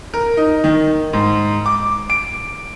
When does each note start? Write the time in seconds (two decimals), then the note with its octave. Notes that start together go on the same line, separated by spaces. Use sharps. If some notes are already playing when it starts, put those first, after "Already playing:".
0.14 A#4
0.37 D#4
0.64 D#3
1.13 G#2
1.66 D6
2.10 D7